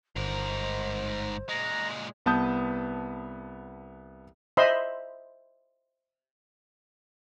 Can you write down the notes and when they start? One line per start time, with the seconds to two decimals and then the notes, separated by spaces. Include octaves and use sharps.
0.16 G1 G#2 A#4 C5
1.49 A#2 G#3 A#5
2.26 C2 B3 B4 A5 D#6 G6
4.57 C5 D#5 E5 B5 C6